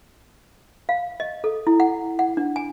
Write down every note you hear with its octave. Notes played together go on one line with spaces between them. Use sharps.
F5
D#5
A4
E4
F#5
F#5
D4
G#5